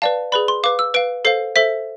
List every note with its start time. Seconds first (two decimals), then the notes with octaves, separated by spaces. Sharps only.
0.02 B4 D5 F5 A5
0.32 G#4 B4 D5 B5
0.48 C6
0.64 B4 F5 D6
0.79 E6
0.94 B4 F5 D7
1.25 A4 C5 F5 C7
1.56 A4 C5 E5 B6